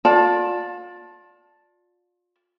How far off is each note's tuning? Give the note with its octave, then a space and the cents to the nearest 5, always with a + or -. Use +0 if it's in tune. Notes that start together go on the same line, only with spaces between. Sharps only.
F4 +30 D5 +0 A5 +0